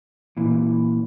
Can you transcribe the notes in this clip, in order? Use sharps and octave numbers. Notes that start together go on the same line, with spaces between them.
A#2 E3